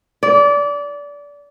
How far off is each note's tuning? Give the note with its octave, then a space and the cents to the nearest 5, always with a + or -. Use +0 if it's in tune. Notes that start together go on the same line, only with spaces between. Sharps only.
D5 -25